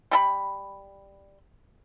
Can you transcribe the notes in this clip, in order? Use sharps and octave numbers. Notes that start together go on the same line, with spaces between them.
G3 A4 B5